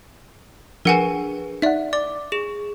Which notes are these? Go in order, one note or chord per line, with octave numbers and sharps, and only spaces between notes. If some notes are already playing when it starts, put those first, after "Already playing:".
F3 D4 G#4 A#4 B4 F#5 G#5
D#4 D5 E5 F#5
D5 D6
G#4 E7